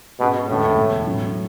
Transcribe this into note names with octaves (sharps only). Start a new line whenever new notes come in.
G#2 B2 G#3 C#4
E2 A2 D3 G#3 C#4 E4
E2 B2 A3
A2 F#3 C#4 E4